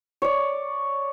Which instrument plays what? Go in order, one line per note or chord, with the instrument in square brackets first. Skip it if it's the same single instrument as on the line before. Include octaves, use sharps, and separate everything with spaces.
[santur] C#5 D5